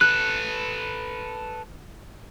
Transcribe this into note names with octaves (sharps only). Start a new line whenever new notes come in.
A4 B4 F#6